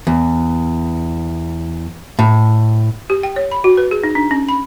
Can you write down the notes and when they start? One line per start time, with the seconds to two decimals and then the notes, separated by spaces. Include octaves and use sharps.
0.07 E2
2.19 A2
3.10 G4
3.23 G5
3.36 C#5
3.51 B5
3.64 F#4
3.77 B4
3.91 G#4
4.04 D#4
4.15 D4
4.31 C#4
4.49 B5